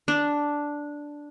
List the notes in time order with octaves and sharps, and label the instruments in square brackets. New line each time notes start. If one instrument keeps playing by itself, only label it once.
[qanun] D4